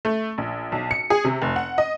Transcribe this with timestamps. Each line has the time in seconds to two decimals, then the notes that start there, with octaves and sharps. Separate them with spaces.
0.05 A3
0.38 A#1
0.72 B1
0.91 C#7
1.10 G#4
1.24 C3
1.42 F1
1.56 F#5
1.78 D#5